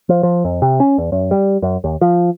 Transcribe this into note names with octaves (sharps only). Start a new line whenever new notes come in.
F3
F3
F2
C3
C#4
E2
F#2
G3
F#2
D#2
F3